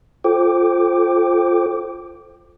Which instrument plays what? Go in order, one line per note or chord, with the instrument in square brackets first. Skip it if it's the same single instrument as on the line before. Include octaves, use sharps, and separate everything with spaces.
[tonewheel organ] F4 A4 C5 G5 D6